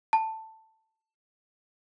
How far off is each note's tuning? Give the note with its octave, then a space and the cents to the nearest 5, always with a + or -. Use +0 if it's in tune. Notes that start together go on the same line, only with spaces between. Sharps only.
A5 +10